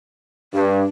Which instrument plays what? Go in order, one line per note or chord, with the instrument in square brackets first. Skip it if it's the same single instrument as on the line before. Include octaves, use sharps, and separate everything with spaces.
[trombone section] G2 [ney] D4